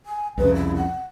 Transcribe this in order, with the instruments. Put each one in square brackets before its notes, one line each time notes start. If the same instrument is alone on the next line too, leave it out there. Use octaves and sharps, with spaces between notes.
[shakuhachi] G#5
[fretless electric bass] C2 F2 C#3 [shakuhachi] B4
[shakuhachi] E4
F#5